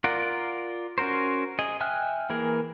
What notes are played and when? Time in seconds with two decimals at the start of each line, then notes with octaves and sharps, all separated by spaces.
0.04 F4 A#4 D5 F#5
0.98 C#4 F#4 A#4 C5
1.59 G#4 D#5
1.81 E5 G5 G#5 F6 F#6
2.30 E3 A#3 G#4 A#4